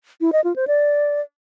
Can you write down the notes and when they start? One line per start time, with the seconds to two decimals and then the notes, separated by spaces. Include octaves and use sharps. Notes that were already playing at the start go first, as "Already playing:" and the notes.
0.21 E4
0.33 D#5
0.44 F4
0.56 C5
0.67 D5